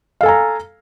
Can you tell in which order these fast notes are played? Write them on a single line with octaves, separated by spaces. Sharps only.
F5 A4 G#5 A#5